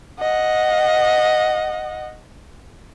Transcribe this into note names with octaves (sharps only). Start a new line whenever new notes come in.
D#5 F#5